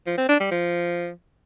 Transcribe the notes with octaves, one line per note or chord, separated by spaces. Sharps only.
F3
C4
D4
G3
F3